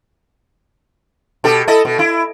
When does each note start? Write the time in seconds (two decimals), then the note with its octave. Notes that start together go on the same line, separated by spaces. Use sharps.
1.44 B2 G4 A4
1.68 E4 A4 D#5
1.85 B2
1.99 E4